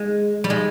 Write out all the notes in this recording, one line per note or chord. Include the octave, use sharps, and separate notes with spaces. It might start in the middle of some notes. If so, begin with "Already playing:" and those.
Already playing: G#3
G3
G#3